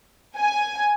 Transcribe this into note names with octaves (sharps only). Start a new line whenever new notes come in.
G#5